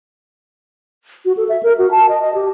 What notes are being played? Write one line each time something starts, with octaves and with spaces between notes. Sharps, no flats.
F#4
A4
E5
A#4
F#4
A5
D#5
D#5
G4